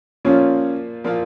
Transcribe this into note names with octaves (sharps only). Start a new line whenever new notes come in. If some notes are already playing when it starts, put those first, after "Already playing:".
A#2 F3 A#3 C#4 F4
A#2 F3 A#3 F4